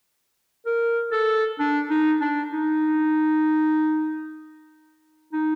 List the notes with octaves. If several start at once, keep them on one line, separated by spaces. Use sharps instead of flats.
A#4
A4
D4
D#4
D4
D#4
D#4